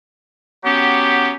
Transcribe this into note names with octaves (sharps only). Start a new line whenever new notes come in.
F#3 B3 C#4 G4